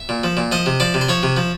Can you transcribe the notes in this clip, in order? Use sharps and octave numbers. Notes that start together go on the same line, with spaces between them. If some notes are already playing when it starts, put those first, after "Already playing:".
Already playing: E5
A#2
F3
A#2
F3 D#5
C3
F3 D5
C3
C5
F3 C#5
C3
F3